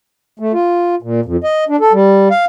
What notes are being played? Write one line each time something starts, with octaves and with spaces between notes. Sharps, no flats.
A3
F4
A#2
F2
D#5
D4
A4
G3
F5